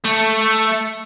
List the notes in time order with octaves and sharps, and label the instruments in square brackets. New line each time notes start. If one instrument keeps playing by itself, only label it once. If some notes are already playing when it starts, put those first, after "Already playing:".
[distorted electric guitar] A3